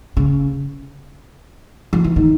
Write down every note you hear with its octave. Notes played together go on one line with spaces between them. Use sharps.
C#3
F3
E3
D#3